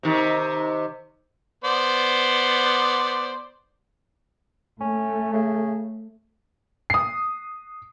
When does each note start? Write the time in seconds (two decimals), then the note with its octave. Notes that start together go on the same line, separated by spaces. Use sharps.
0.03 C3 D#3
1.64 B3 C5 D5
4.81 A3 C#4
5.33 C#3
6.90 D#6 C7